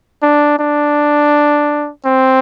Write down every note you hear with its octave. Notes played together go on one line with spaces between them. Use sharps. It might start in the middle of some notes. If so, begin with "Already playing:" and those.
D4
D4
C4